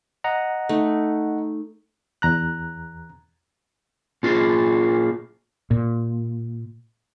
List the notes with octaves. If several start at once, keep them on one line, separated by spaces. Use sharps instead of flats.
D#5 F#5 A#5
A3 D#4
E2 A#5 F#6
A#2 F4 G#4
A#2